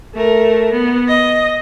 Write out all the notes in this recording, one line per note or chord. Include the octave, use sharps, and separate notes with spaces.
A3 A#4
B3
D#5